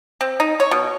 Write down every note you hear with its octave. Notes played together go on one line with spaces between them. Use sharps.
C4
D#4
C#5
B2